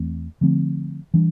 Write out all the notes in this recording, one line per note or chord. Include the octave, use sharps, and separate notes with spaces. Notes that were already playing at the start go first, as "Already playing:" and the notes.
Already playing: E2 E3 A3 C4
D3 F3 A3 C4
E3 G3 D4